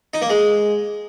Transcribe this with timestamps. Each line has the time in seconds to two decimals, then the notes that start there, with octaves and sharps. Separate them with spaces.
0.14 D#4
0.22 A#3
0.30 G#3